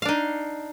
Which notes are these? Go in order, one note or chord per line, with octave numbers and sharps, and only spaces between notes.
D4 D#4 F5